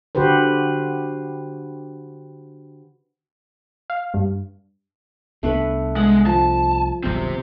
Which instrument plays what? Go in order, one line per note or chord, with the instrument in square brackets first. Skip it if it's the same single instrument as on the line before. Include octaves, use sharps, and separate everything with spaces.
[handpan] D3 F#4 G4 B4 C5
[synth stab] F5
G2
[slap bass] C2 B3 D4 [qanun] A3 B4
[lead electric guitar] G#3 [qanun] F#5
[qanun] F3 [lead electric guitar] A5
[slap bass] D#1 B1 G2 [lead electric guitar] C3 C4